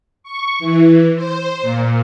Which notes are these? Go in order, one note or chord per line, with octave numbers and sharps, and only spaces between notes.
C#6
E3
C5
A#2